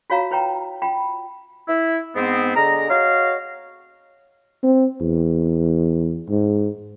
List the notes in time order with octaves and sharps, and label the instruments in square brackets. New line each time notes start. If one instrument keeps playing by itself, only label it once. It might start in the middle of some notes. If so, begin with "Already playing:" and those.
[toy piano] F4 F#4 C#5 F5 A#5
E4 B4 C#5 G5 A#5
F4 G5 B5
[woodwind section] E4
G#2 B3 C4
D3 G#4 D#5 A#5
F#4 C#5 D#5 F5
[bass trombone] C4
E2
G#2